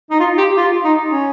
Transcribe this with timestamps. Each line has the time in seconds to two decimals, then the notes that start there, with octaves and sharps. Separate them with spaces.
0.10 D#4
0.20 F4
0.38 G4
0.57 F4
0.84 D#4
1.11 C#4